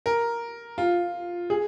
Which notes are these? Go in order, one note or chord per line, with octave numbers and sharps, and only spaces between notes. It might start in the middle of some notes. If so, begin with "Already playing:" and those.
A#4
F4
G#4